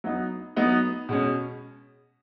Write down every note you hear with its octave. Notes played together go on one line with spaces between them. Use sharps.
F#3 B3 D#4
F#3 B3 D#4
B2 G#3 C#4